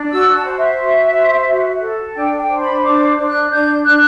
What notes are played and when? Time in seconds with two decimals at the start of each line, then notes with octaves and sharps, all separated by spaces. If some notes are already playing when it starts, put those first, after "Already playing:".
Already playing: D4
0.11 F#4 E6
0.34 A5
0.45 C5
0.56 E5
0.79 F#4
1.13 C5
1.47 F#4
1.81 A4
2.14 D4 G5
2.38 G5
2.49 C5
2.60 B5
2.83 D4 D6
3.16 D4
3.28 F#6
3.50 D4 G6
3.84 D4 F#6